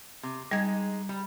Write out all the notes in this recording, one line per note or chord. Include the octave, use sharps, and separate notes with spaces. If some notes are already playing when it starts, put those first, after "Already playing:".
C3
G3 G#3 D#4 G#6
G3